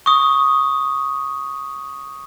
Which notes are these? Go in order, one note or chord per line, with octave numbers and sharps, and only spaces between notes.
C#6 D#6